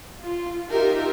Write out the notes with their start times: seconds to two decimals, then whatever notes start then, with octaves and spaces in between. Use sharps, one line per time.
0.20 F4
0.70 D#4 F4 G4 A#4 E5